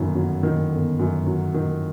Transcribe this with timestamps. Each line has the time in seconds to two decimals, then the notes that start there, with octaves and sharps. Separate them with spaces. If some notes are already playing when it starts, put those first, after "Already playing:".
Already playing: G1 F#2 D#3
0.15 F#3
0.43 D#3
0.71 G1
0.99 F#2
1.27 F#3
1.54 D#3